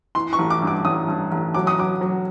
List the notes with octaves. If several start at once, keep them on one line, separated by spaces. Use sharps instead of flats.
E3 C6
C#6
A1
D6
G2
D6
A1 D#6
G2
A1
F#3 D6
D#6
F#3 D6
F#3